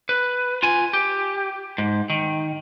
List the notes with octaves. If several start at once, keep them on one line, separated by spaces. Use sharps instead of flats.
B4
F4 G#5
G4
G#2
D#3